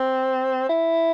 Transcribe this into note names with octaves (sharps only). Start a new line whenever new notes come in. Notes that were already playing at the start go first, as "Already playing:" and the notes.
Already playing: C4
E4